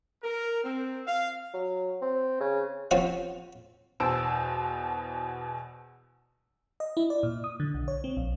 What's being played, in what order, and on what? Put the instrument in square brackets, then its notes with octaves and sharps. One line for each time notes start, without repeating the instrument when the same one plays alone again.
[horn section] A#4
C4
F5
[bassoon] F#3
C4
C#3
[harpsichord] F3 C4 C#4 F4 F#4
[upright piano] E2 B2 C5 A5 E6 D7
[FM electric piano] D#5
E4
D5
A#2
D#6
D3
B1
C#5
C4
A#1